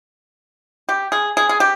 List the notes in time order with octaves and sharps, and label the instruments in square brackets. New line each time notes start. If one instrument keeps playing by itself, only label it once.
[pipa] G4
G#4
G#4
G#4
G4